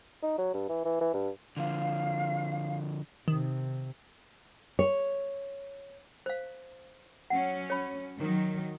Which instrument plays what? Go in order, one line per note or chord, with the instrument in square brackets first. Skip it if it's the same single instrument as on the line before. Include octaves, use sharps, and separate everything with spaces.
[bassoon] D#4
F#3
G2
E3
E3
E3
G2
[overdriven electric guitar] D3 F3 [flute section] F5
[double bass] C3 [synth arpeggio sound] D#3
[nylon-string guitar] C#5
[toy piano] C5 F5
[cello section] F#3 C#4 [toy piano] F#5
[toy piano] C#5 B5
[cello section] D#3 F#3